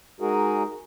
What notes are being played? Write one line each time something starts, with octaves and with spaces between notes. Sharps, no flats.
G#3 D#4 F#4 G#4 A#4